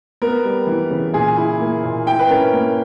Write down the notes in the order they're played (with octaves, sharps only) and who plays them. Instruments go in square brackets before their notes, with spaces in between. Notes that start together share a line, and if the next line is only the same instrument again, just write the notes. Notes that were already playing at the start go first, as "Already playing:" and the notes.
[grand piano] B3 A#4
G3
E3
C#3
A#2 G#4
E4
A#3
A#2
E4 G5
B4
C#4 A#4
A#3